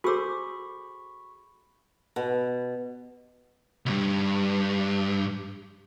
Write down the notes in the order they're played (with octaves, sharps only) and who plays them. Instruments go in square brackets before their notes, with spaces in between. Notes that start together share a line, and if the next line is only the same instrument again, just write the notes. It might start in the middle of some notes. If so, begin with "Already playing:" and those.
[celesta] F#4 D6 [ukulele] G#4 C5 [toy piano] A4 E6 [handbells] B5 C#6
[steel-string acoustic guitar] B2
[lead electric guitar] C#2 G2